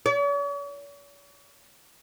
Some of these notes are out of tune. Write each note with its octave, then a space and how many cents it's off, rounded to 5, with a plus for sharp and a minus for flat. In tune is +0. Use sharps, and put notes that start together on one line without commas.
C#5 +45